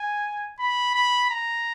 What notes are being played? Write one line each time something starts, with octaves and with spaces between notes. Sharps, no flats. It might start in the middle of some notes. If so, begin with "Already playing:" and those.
Already playing: G#5
B5
B5
A#5